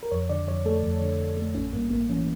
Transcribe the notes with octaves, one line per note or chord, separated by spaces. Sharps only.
A#4
F2 C#5
D3 D5
F2 C#5
A3 A4
F2
D3
F2
A3
A1 C#4
G2 A#3
A1 A#3
E3 C#4